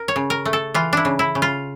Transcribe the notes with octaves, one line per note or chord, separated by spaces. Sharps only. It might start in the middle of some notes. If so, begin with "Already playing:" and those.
Already playing: A#4
C#5
C#3
A#4
A3
A4
E3 F4
D4 E4
C#3
E4
C#3
F4